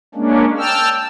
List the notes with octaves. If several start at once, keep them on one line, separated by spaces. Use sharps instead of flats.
G#3 A#3 C#4 D4
G5 A5 E6 F6